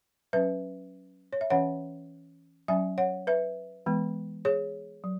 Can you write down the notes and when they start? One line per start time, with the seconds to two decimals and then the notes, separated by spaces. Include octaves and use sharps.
0.33 F#3 C#4 B4 E5
1.33 C#5
1.41 E5
1.50 E3 C#4 C#5 F#5
2.68 F#3 C#4 E5 G#5
2.98 C#5 F#5
3.27 B4 E5
3.86 E3 G#3 B3
4.45 G#4 C#5
5.04 F#3